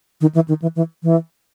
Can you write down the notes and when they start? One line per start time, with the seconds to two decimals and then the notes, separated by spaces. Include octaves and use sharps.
0.21 D#3
0.34 E3
0.48 D#3
0.62 E3
0.76 E3
1.03 E3